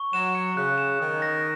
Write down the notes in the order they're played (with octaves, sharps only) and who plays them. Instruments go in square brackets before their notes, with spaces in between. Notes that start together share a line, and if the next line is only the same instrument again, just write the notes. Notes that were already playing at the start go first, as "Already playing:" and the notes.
Already playing: [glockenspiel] C#6
[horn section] F#3 [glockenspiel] E7
[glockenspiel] C#7
[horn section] C#3 [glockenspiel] F#6
[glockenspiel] E7
[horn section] D#3 [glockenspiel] D#6
[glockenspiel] A#6